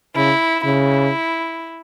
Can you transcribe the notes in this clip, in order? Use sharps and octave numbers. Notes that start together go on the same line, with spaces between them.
C#3 E4
C#3 E4